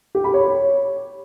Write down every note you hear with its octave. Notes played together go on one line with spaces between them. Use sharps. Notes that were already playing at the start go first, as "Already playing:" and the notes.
G4
B5
C#5